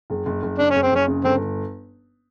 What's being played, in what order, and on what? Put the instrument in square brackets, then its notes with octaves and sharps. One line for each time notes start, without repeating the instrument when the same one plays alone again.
[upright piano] F#1
F#1
F#1
[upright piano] C#3 [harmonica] D4
[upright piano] F#1 [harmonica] C#4
[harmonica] C4
[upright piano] F#1 [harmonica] C#4
[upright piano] C#3
[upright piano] G1 [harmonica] C4